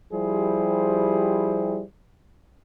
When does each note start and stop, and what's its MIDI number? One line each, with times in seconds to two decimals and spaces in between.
0.13 1.82 53
0.13 1.82 55
0.13 1.82 64
0.13 1.82 67
0.13 1.82 68
0.13 1.82 72